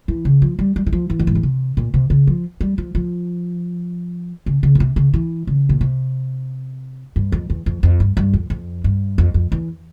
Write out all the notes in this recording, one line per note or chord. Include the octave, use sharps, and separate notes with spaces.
E3
C#3
F3
G3
G3
E3
F3
E3
G2
G#2
A#2
C3
A#2
C3
C#3
F3
G3
F3
F3
C#3
C#3
A#2
C3
C#3
E3
C#3
A#2
C3
G2
F2
E2
F2
F2
G2
G2
F2
F2
G2
F2
F2
E2